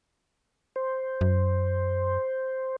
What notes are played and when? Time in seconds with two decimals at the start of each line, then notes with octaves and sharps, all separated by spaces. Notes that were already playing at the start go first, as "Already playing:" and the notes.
0.76 C5
1.21 F#2